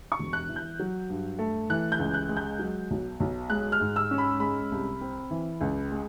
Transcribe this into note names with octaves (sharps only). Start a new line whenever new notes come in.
C#6
E1
F#6
E3
G6
F#3
G2
A3
E3 F#6
G6
C#2
F#6
G#3
G6
F#3
B1
B1
G#3 F#6
F6
G#2
E6
C#4
B5
G#3 B5
C2
C4
E3
C#2
G#3